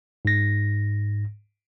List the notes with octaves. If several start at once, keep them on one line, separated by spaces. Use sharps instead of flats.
G#2 A#6